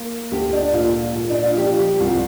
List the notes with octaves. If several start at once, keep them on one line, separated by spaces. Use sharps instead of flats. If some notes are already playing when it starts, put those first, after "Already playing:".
Already playing: A#3
D2 G4
D4
A#2 F4
A#2
D4
F4
F3 G4
G4
C2 F4